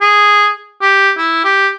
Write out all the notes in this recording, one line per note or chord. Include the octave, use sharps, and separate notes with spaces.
G#4
G4
E4
G4